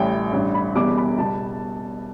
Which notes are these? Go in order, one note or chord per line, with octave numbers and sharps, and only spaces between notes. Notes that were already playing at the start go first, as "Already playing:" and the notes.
Already playing: A1 A2 G3 G5
A1 G2 G3
B5
E1 E2 B2 G3 D6
B5
B2 G3 A5